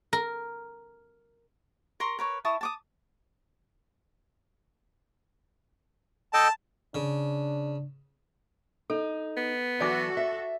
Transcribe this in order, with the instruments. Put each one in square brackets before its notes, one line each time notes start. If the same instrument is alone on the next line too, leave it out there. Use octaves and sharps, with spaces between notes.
[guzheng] A#4
[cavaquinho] A#4 A#5 C6 C#6
A#4 B4 C#5
E4 A5 C#6 D#6
A5 D6 D#6
[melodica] A4 D#5 G5 [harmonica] A5
[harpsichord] C#3 [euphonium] D4
[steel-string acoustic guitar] D#4 [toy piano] A4
[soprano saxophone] B3
[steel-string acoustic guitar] E3 F#3 [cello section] F#4 A4 [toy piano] D5 G#5 D6
[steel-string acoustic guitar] E5